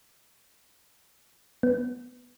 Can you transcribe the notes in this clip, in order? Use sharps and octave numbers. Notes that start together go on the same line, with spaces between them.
B3